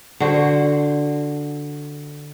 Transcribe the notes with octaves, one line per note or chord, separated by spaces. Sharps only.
D3 F#4 C5